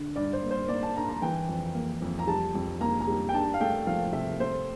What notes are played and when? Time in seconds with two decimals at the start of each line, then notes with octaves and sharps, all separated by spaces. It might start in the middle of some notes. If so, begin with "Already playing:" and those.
Already playing: D3
0.16 G2 D5
0.33 C5
0.43 A#3
0.51 C5
0.68 A#3 D5
0.83 A5
0.95 D4 A#5
1.08 A#5
1.22 E3 G5
1.49 F2
1.74 A#3
2.02 F2
2.19 A#5
2.27 G3 A5
2.55 F2
2.81 A#3 A#5
3.01 A#5
3.07 G3
3.29 G5
3.34 D4 A5
3.54 F5
3.61 A3 G5
3.87 F3 F5
4.13 C3 E5
4.40 A3 C5